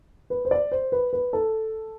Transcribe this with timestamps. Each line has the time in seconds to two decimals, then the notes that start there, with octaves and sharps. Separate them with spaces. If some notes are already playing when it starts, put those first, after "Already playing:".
0.30 B4
0.45 C5
0.51 D5
0.72 C5
0.92 B4
1.13 B4
1.33 A4